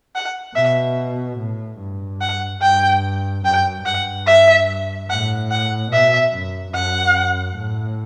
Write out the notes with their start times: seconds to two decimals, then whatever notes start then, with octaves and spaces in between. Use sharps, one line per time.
0.16 F#5
0.56 B2 E5
1.39 A2
1.80 G2
2.21 F#5
2.62 G2 G5
3.45 F#2 G5
3.85 G2 F#5
4.27 E5
5.10 A2 F#5
5.51 F#5
5.91 B2 E5
6.34 F#2
6.74 F#2 F#5
7.57 A2